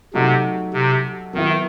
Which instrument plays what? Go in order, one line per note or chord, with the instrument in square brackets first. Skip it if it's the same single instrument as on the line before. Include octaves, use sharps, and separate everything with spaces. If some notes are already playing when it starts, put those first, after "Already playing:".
[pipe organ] C3 [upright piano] F#3 A3 D#4 F#4
[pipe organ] C3
[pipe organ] D#3 [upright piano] F#3 B3 E4